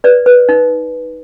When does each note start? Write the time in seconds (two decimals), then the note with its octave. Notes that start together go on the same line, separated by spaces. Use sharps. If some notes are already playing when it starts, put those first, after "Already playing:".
0.04 B4 D5
0.26 B4
0.49 D#4